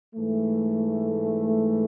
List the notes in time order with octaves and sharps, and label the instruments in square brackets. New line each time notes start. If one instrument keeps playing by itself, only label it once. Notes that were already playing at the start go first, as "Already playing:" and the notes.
[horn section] G#2 E3 A3